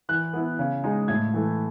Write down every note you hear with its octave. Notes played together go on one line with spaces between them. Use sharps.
E3 F#6
B3 E4
C#3
G#3 D#4
A2 G#6
E3 A3